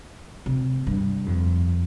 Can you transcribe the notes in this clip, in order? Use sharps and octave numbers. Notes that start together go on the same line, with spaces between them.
C3
G2
F2